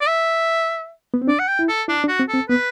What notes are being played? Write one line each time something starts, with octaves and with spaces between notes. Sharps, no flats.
D5
E5
B3
C4
D4 D5
F#5
G5
E4
A4
D4 E4
D4
F#4
C4
A4
C4
B3 B4